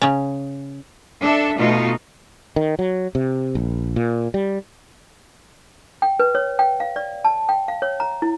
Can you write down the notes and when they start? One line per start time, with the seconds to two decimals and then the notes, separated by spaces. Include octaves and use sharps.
0.02 C#3 C#4
1.23 D4 A4 E5
1.58 B2 A3 D#4 F4
2.56 D#3
2.79 F#3
3.15 C3
3.55 A#1
3.96 A#2
4.34 G3
6.02 G5
6.20 B4
6.35 C#5
6.59 G5
6.80 F5
6.96 D5
7.25 A5
7.49 G5
7.68 F5
7.82 C#5
8.00 A#5
8.22 E4